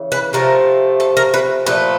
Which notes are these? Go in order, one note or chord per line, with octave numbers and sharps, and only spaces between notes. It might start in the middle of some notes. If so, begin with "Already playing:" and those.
Already playing: C#3 E3
B4
C3 F3 A3 A#4
A4
A#4
B4
A#2 F3 A3 B4